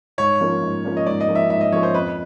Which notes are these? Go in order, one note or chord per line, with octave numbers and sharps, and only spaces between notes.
G#2 C#5
F3 A#3 C#4
G#2
F3 A#3 C#4
D#5
G#2 D5
D#5
F3 A#3 C#4
E5
G#2 E5
D#5
F3 A#3 C#4 C#5
C5
F2 B4